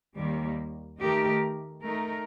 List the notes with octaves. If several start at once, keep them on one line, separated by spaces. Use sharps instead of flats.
D#2 D#3 G3 A#3
D#3 A3 D#4 G4 A#4
A3 D#4 A#4